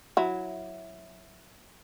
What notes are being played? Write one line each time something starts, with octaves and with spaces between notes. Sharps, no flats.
F#3 E4